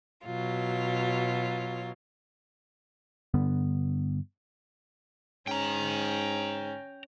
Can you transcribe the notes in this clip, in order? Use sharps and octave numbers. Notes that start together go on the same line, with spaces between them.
B2 F#3 F4
G2 D3 G3 B3
G#2 C#4 G5 A#5